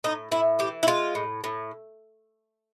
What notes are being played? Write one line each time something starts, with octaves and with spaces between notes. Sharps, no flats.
A2 D#4
A2 E4
E3 G4
E4
G#3 F4
A2
A2